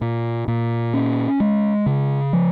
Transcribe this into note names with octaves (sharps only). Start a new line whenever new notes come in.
A#2
A#2
C#4
G#3
C#3
F3